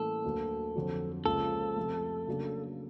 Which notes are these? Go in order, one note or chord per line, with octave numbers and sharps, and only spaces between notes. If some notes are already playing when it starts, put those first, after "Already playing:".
Already playing: A2 E3 G3 A#3 C#4 A4
D2 D3 F#3 A#3
F2 D3 F#3
C#2 C#3 F3 A#3 A4
F2 C3 F3 A3
C#3 F#3 A#3 D4